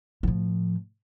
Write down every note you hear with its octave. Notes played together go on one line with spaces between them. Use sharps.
A2 F3